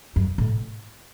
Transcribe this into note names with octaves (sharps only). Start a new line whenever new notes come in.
F#2
A2